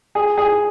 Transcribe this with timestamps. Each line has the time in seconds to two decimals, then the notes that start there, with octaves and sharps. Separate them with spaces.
0.15 G#4
0.38 G#4